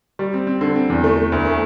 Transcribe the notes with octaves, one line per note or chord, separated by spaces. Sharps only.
G3
C4
C4
D3
C4
E2
A3
A3
D2
A3